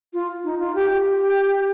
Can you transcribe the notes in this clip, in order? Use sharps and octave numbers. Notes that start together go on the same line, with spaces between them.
F4
D#4
F4
G4
G4